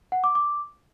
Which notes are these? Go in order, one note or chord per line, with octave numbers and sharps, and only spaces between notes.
F#5
D6
D6